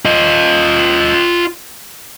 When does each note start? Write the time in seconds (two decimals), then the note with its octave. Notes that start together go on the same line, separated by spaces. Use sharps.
0.05 F4 D#5